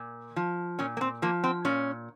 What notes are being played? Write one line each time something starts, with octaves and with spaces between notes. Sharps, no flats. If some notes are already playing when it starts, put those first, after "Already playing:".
Already playing: A#2
F3
A#2 C#4
A#3
C4
F3 A#3
C4
A#2 C#4